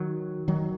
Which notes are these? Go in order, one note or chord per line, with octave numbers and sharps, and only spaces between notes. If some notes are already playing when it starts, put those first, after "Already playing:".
Already playing: D#3 F#3
D#3 F#3